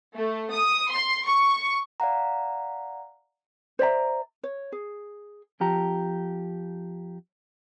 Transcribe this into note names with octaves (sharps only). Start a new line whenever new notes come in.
A3
D#6
C6
C#6
D5 F5 F#5 A#5
C5 D5 E5 A#5
C#5
G#4
F2 F3 G4 A#5